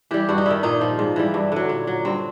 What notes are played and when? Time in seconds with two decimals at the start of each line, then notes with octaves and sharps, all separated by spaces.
0.11 E3 G3 G4
0.29 G2 F#4
0.38 D#4
0.46 D#3 G3 E4
0.63 A#2 D#4
0.81 F3
0.99 G#2
1.16 E3 G3
1.34 G2
1.52 D3 F#3
1.69 A#2
1.87 F#3
2.05 G2 C4